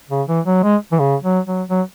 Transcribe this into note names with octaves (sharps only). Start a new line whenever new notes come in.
C#3
E3
F#3
G#3
E3
C#3
F#3
F#3
F#3